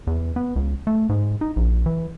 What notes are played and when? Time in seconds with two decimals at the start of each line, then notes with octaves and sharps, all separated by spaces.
0.07 E2
0.36 B3
0.56 C#2
0.87 A3
1.09 G#2
1.41 D#4
1.56 A#1
1.86 E3